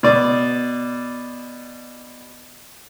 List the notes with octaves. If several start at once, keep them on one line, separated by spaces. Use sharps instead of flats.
B2 D5